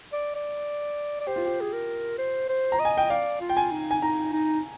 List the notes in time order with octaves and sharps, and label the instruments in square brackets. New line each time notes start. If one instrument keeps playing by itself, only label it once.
[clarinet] D5
D5
D5
[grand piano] G4 [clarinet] C5
[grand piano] F4
G4
[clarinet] G#4
A#4
C5
C5
[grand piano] A#5
[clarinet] D#5
[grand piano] G#5
G5
[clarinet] D5 [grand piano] F5
[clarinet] F4
[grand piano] G5
G#5
[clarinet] D#4
[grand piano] G#5
[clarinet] D#4 [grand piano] A#5
[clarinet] D#4